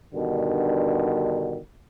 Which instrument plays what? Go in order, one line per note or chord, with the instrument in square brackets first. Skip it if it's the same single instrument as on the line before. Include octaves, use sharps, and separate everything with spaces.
[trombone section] G2 B2 D3 D#3